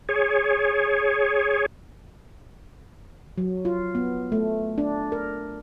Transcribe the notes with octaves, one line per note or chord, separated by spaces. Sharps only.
G#4 C#5
F#3
F4
B3
A3
D4
A#4